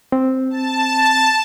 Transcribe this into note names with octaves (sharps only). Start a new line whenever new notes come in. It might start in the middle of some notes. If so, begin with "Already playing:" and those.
C4
A5